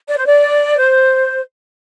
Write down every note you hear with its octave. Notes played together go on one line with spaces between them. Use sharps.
D5
C5
D5
C5